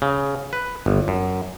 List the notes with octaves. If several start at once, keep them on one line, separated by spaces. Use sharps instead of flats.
C#3
B4
G1
F#2